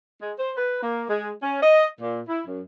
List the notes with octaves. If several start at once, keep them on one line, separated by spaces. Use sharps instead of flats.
G#3
C5
B4
A#3
G#3
C#4
D#5
A#2
E4
F#2